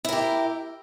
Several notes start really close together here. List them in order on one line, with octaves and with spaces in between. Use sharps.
E4 A#4 G4